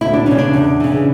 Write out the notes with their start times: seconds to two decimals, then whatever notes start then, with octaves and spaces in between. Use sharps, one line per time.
0.01 D2 E4
0.14 D4
0.26 C#3 E3 C#4
0.38 D4
0.53 E2
0.80 C#3 E3